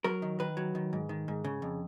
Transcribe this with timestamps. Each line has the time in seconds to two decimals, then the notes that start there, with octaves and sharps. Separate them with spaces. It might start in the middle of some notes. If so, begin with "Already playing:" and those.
0.04 F#3 A#4
0.22 D#3
0.40 D#3 B4
0.57 F#3
0.75 D#3
0.93 G#2
1.09 D#3
1.28 G#2
1.44 C#3
1.62 F2